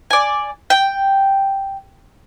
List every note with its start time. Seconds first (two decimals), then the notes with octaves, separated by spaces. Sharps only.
0.10 D5 G#5
0.70 G5